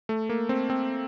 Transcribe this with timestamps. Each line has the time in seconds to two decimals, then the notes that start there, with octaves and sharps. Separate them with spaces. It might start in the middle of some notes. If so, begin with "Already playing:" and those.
0.09 A3
0.29 A#3
0.49 C4
0.70 C4